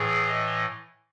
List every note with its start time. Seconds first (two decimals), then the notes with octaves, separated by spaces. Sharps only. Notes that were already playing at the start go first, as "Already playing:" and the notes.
Already playing: A2 E3 G#4
0.27 D#5